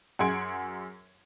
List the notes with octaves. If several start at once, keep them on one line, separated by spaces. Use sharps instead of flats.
F#2 G#4 F#5 C6 G#6 D7